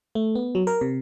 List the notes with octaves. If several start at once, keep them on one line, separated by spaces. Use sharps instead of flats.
A3
B3
F#3
A#4
C3